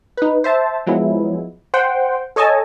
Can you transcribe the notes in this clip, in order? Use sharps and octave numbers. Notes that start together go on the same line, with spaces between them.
D#4 B4
C5 E5 A5
F3 F#3 G#3 B3 E4
C5 F#5 G5
A4 C#5 D#5 G#5 A5